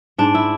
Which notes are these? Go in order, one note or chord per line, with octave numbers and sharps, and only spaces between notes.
G#2 D4
E4